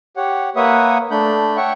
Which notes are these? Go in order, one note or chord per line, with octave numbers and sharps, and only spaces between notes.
G4 C#5 F#5
A#3 B4 C#5 E5 F#5 D#6
A3 D4 B5 G6
C#5 E5 F#5 G5 C#6